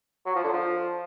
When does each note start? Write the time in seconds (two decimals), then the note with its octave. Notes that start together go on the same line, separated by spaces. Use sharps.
0.26 F#3
0.35 F3
0.44 D3
0.53 F3